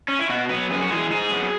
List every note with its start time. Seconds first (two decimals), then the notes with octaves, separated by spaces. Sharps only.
0.08 C#4
0.19 E4
0.29 B2 F#4
0.50 F#3 B3 B4
0.70 F#2 G#4
0.81 F#4
0.90 E3 G#3 G#4
1.11 G#2 G#4
1.31 F#3 B3